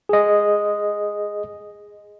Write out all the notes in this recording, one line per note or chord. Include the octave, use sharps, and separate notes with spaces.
G#4 D#5